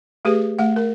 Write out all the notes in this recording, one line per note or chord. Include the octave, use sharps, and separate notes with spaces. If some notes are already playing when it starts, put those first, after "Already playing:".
A3 G4 G#4 B4
A3 F#5
A#4